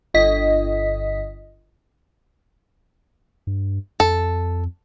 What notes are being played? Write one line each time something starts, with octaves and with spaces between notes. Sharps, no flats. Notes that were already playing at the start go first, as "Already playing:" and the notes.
G1 D#5 B6
G2
F2 A4